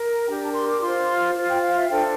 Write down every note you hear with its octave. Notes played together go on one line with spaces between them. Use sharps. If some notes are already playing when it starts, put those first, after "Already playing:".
Already playing: A#4
D4 G4 A#4 G5
A5
C6
D6
F4 C5 C6
F4 C5
G5
F5
E5
D4 A4 C5 G5